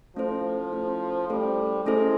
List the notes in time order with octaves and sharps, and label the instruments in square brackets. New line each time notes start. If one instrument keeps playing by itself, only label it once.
[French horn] F3 [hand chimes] A3 C#4 E4 A4 C5
[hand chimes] A3 C#4 E4 A4 C5
[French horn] G3 [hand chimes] A3 C#4 E4 A4 C5
[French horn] G#3 [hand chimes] A3 C#4 E4 A4 C5